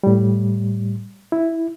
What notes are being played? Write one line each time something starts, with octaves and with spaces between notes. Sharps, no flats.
A2 G3
E4